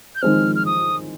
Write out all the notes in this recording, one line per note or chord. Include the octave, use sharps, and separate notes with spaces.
G6
D#3 G#3 C4 F6
F6
D#6